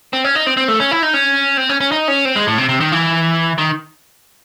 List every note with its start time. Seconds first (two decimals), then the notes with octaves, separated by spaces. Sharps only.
0.13 C4
0.24 C#4
0.35 D#4
0.46 C4
0.57 C4
0.68 A3
0.80 C#4
0.91 E4
1.02 D#4
1.14 C#4
1.57 C4
1.69 C#4
1.81 C#4
1.92 D#4
2.08 C#4
2.25 C4
2.36 G#3
2.47 A2
2.58 C3
2.69 C3
2.81 D#3
2.92 E3
3.58 D#3